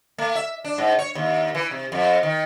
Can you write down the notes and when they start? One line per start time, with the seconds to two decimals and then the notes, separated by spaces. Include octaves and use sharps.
0.18 A3
0.35 E5
0.64 D4
0.78 G#2
0.99 C#5
1.15 D#2
1.55 E3
1.71 C3
1.92 F2
2.23 D#3